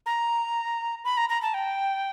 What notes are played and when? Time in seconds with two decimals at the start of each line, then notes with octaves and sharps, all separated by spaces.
0.06 A#5
1.05 B5
1.17 A#5
1.29 A#5
1.42 A5
1.54 G5